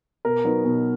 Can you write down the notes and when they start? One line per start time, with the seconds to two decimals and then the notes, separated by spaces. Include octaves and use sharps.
0.25 B2 A#4
0.45 F#3 B3 D#4
0.65 B2